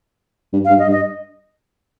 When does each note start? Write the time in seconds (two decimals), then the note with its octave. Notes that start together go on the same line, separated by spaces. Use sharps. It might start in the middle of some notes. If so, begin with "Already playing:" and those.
0.53 G2
0.65 F5
0.70 G2
0.79 D#5
0.88 G2
0.91 D#5